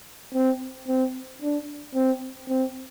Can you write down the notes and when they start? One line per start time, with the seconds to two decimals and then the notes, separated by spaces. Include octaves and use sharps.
0.34 C4
0.88 C4
1.42 D4
1.95 C4
2.49 C4